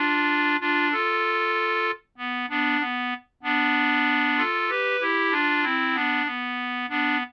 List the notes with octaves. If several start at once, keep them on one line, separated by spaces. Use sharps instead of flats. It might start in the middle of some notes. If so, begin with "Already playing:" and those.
Already playing: D4 F4
D4 F4
F4 A4
B3
B3 D4
B3
B3 D4
F4 A4
G4 B4
E4 G4
D4 F4
C4 E4
B3 D4
B3
B3 D4